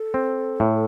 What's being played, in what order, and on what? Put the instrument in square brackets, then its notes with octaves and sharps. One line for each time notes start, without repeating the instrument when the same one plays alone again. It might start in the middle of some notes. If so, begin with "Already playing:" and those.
Already playing: [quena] A4
[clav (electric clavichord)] C4
A2